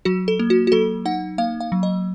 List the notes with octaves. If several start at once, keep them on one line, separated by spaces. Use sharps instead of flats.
F#3 F#4
A4
A#3
F#4
F#4
F#3 A4
D#4 F#5
A#3 F5
F5
F#3
D#5